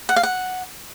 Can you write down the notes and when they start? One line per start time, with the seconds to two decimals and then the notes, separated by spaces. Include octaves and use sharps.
0.09 F#5
0.16 F5
0.23 F#5